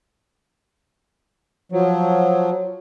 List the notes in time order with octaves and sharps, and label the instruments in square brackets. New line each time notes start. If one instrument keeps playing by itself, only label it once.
[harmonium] F3 F#3